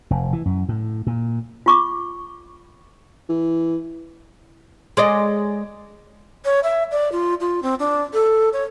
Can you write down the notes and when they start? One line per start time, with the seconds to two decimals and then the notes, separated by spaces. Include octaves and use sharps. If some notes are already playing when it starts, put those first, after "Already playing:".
0.11 F1
0.33 E3
0.46 F#2
0.69 A2
1.07 A#2
1.66 F4 C#6 D6
3.29 E3
4.97 G#3 D5 D#5
6.45 C#5
6.63 E5
6.91 D5
7.12 F4
7.40 F4
7.63 C4
7.79 D4
8.13 A4
8.53 C#5